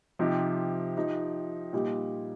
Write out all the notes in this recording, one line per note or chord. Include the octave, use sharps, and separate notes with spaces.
C3 F3 D#4 G4
F3 D#4 G4
A#2 G3 D#4 G4